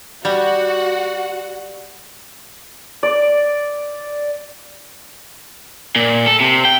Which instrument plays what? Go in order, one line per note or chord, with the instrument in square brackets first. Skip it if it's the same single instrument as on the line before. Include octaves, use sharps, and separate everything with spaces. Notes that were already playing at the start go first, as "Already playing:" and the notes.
[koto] G3 [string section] F#4 F#5
[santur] D5
[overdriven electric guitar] A#2
A4
C3
G5